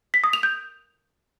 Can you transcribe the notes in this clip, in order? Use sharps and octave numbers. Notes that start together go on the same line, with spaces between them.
B6
D#6
F7
G6